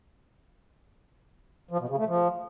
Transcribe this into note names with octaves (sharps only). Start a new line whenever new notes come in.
F3
B2
C#3
A3
F3